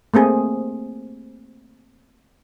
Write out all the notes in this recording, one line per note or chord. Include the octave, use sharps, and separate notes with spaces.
A3 A#3 C4 G#4